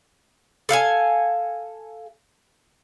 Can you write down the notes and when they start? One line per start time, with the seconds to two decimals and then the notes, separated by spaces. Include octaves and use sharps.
0.69 A4 F5 G5 G#5